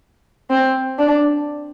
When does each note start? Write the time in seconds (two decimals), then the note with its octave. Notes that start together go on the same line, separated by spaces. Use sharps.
0.50 C4
0.98 D4